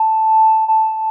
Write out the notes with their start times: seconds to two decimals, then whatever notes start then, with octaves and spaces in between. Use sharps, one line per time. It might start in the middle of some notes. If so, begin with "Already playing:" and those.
Already playing: A5
0.68 A5